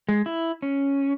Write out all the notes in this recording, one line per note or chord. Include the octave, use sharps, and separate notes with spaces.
G#3
E4
C#4